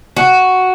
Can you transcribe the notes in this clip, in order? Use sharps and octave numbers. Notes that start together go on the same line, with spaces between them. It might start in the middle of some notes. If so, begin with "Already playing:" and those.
F#4